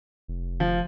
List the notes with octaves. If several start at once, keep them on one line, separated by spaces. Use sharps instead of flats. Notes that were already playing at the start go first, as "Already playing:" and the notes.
F1
F3